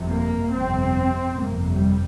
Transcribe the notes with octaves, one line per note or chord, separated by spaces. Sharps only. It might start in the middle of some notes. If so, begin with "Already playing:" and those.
Already playing: G1 F2 C3
A#3
G1 F2 C3 C4
G1 F2 C3 A#3
G3